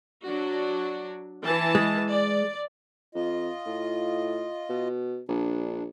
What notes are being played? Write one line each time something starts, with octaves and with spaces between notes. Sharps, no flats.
F#3 D4 F#4
E3 A5
G#3
D5
F2 F4 D#5
A2
B2
A#1 D4